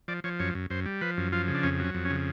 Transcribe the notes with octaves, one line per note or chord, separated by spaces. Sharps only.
F3 D5
F3 C#5
F#2 C#5
F#2
F#2 C5
G3
F3 B4
F#2
F3 F4
C#3
D4
F2 C#4
F#3
C#4
F2
C#4
C#3